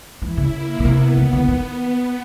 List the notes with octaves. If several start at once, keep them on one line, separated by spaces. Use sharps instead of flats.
E3 E4
C#3
A#3
C#3
C3 B3
C#3
D3
D#3